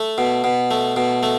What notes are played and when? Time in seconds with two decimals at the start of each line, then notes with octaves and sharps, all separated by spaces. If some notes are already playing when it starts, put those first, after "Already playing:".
Already playing: A3
0.18 B2
0.44 B2
0.71 A3
0.96 B2
1.23 A3